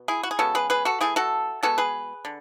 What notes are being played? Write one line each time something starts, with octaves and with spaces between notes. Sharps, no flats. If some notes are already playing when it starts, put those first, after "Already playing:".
Already playing: B2
E4 G#4
F#4
G#4
C#3 G#3 B3 F#4 A4
G#4 B4
G#4 B4
F#4 A4
E3 A3 E4 G#4
F#4 A4
B2 G#3 B3 F#4 A4
G#4 B4
D3